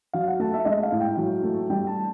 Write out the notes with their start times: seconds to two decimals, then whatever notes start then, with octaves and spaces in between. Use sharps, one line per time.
0.13 F#3 F5
0.27 F#5
0.40 A3 A5
0.54 E5
0.65 G#3 D#5
0.83 F5
0.92 A2
1.01 G5
1.17 F#3
1.43 A3
1.70 G3 G5
1.87 A5